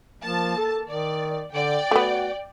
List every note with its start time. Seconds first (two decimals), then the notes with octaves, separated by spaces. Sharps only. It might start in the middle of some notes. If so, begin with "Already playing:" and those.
0.23 F3 A#3 A5
0.57 A4
0.89 D#3 D5
1.53 D3 D5 G5
1.91 A3 B3 F#4